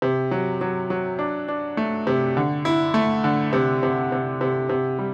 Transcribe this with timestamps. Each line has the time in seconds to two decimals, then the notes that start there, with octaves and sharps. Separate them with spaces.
0.02 C3
0.31 F#3
0.61 F#3
0.90 F#3
1.19 D4
1.48 D4
1.77 A3
2.07 C3
2.37 D3
2.65 E4
2.94 A3
3.24 D3
3.53 C3
3.83 C3
4.12 C3
4.41 C3
4.69 C3
4.99 G3